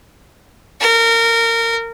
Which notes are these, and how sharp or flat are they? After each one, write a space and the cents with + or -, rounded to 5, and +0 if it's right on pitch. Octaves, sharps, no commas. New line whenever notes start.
A#4 -25